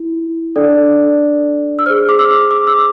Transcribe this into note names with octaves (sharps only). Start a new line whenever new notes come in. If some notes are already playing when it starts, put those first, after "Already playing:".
Already playing: E4
D4 A4 D5
E6
G#4 C5 F6
D6
E6
D6
E6